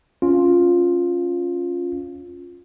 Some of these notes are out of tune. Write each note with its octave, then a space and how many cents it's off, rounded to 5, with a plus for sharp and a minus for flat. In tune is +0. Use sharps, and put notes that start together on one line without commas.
C#4 +0 F4 +5